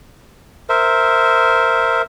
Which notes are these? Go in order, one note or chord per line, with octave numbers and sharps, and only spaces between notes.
A#4 C5 E5